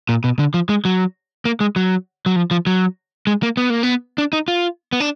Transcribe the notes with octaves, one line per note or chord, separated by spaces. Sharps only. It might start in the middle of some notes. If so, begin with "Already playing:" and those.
A#2
B2
D3
F3
G#3
F#3
A#3
G#3
F#3
F#3
F3
F3
F#3
G#3
A#3
B3
A#3
B3
D4
D#4
F4
B3
D4